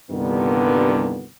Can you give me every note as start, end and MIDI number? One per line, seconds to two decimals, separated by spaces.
0.11 1.26 36
0.11 1.26 43
0.11 1.26 46
0.11 1.26 50
0.11 1.26 51
0.11 1.26 59